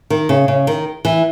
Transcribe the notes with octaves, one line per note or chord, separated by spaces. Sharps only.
D#3
C#3
C#3
D#3
E3